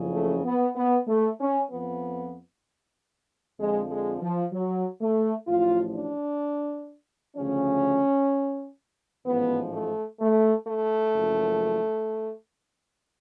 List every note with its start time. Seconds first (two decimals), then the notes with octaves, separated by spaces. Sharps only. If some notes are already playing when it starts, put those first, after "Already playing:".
Already playing: F#1 F2 C#3 F3
0.13 A3
0.45 B3
0.76 B3
1.08 A3
1.40 C#4
1.70 F2 F3 B3
3.59 F2 D3 F3 G#3
3.90 G#3
4.22 F3
4.53 F#3
5.01 A3
5.47 A1 A2 F3 F4
5.95 D4
7.36 D2 C#3 F3 C#4
9.25 A1 G#2 F3 B3
9.72 A3
10.20 A3
10.67 A3
11.14 F#1 F#2 F3